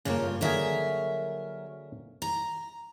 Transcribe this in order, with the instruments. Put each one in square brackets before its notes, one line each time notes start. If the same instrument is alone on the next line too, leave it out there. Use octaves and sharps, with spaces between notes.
[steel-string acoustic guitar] G2 F4 C#5 [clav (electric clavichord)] C#3 A#3
[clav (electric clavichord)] D3 A#3 G#4 [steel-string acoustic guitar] F#3 A#4 E5
[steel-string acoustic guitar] A#5